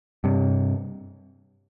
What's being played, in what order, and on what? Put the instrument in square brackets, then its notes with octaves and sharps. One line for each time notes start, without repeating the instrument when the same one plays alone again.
[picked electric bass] G2 C3